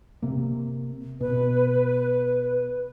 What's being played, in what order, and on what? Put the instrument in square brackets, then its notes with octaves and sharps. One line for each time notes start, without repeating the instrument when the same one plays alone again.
[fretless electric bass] C3 A#3
[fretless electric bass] B2 [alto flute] B4